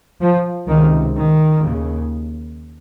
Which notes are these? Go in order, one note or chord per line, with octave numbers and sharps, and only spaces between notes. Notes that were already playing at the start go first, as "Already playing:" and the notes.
F3
C#2 C3 D#3
D#3
D#2 C#3